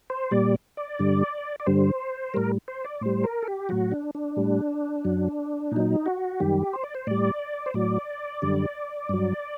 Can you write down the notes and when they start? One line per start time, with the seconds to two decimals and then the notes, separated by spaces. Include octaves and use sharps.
0.10 C5
0.31 A#2 G3 D5
0.77 D5
0.99 G2 D3 G3
1.60 D5
1.66 G2 D3 G3 C5
2.34 A2 G3 A#4
2.68 C5
2.85 D5
3.01 A2 G3 C5
3.24 A#4
3.43 A4
3.47 G4
3.69 A2 F#3 F#4
3.92 D4
4.15 D4
4.36 A2 G3
5.04 F#2 F#3
5.72 A#2 F#3 D#4
6.06 F#4
6.40 F#2 D#3 G3 G4
6.73 C5
6.83 D5
6.95 C5
7.07 A2 G3 D5
7.66 C5
7.74 A2 F#3 D5
8.42 F#2 D3 G3
9.09 G2 F#3